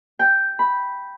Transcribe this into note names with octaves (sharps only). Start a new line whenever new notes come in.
G5
B5